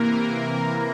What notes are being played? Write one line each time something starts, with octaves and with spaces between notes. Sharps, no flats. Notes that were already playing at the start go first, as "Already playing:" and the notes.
Already playing: C3 E3 A#3 A#4
C3